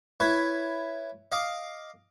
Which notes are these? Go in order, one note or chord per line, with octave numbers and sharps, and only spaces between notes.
E4 B4 C#5
D#5 F5 D6